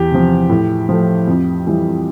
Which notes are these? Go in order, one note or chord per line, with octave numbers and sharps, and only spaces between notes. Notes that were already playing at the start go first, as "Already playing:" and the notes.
Already playing: E2 G4
C3 F3
A2
F3 A3
F2
E3 G3